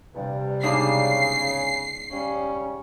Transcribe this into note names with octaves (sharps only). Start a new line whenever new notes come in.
E2 G2 C3 G3
G#2 C#3 B3 D4 C7
C#3 G3 C#4